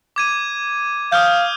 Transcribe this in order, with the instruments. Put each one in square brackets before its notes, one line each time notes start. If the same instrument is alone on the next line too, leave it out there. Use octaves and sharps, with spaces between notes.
[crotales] D6 G#6 D#7
[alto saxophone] F5 [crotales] D#6 F6 G6